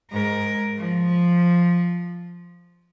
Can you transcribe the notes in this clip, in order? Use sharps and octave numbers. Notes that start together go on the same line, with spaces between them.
G#2 A#4
F3